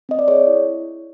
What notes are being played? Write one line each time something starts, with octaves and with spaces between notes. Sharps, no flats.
C4 D#5
D5
G#4 C#5
E4